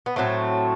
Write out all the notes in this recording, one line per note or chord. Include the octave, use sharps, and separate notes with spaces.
B3
A2 F#3 A3 C4